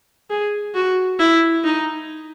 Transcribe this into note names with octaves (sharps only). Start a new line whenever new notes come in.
G#4
F#4
E4
D#4